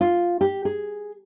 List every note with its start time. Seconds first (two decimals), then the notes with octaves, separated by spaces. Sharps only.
0.01 F4
0.41 G4
0.65 G#4